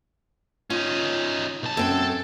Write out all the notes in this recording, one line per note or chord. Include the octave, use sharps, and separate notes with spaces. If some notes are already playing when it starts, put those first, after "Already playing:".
C#4 D#4 F4
B1 A5
F#2 C4 A4